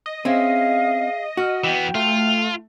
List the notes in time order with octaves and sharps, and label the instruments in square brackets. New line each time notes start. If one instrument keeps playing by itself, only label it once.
[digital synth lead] D#5
[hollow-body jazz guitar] C4 C#4 [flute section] G#4 E5 F5
[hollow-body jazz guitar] F#4 [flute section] F6
[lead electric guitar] E3 B3 [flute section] G5
[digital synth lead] A3 [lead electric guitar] F4